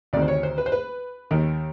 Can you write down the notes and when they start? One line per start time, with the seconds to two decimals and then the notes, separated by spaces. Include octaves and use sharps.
0.13 D2 C3 D#3 D5
0.22 C5
0.28 C#5
0.43 C5
0.58 B4
0.66 C5
0.72 B4
1.31 D#2 D#3